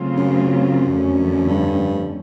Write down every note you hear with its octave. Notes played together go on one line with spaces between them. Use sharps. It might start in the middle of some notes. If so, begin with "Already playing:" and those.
Already playing: C#3 F#3 A3 C4 F4
F#2
F2 D3 F3 A3 C#4
G2